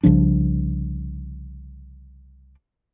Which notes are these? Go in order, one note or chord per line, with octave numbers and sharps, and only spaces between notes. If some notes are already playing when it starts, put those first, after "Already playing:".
C2 C#3 F3 D4